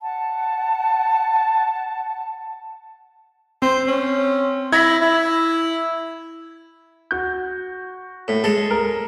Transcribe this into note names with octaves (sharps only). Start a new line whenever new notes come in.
F#5 A5
C4 C5
C#4
E4 G#6 A#6 B6
E4
F#4 G6
A2
G#3 A4
A#4